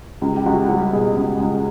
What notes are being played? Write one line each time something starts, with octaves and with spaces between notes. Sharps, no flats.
C#2 G4
G4
C#2 F#4
G3 F#4
B2 G#4
C#2
C#2